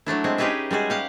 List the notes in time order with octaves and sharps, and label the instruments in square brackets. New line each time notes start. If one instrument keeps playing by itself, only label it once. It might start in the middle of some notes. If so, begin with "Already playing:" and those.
[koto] F#3 A3 D4 E4
G#3 C4
C#4 D#4 G4 G#4 B4 E5
G3 G#3 F#4 G#4
G4 F5 F#5